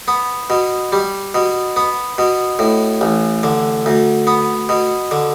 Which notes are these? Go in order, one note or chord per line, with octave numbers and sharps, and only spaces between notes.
B3
B2
G3
B2
B3
B2
A2
A1
D3
D2
B3
B2
D3